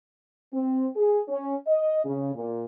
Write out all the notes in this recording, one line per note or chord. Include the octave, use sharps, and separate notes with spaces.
C4
G#4
C#4
D#5
C#3
A#2